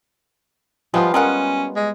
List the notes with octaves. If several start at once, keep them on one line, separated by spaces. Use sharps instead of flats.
F3 G3 G#3 B3 F4
G#3 C#4 A#4 F#5
G#3